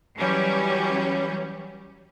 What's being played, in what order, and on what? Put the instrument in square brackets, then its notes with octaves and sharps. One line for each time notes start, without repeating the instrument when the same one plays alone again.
[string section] E3 F#3 G3 C#4